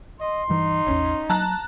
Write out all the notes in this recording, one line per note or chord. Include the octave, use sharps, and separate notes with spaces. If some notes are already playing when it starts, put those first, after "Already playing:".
D#5 C6
G2 E3 D#4
A1 E2 C#4
F#3 A5 A#5 F#6